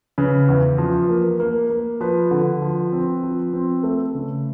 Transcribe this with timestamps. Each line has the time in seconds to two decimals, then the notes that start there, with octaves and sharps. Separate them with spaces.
0.18 C#3 B4
0.48 E2
0.78 F3
1.09 A#3
1.40 A#3
1.70 A#3
2.01 F3 B4
2.31 D3
2.62 F3
2.92 C4
3.23 F3
3.53 C4
3.83 A3
4.15 C#3